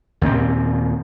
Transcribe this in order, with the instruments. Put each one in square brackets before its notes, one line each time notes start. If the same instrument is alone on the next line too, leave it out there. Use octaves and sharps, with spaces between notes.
[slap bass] D#2 A#2 A#3 C4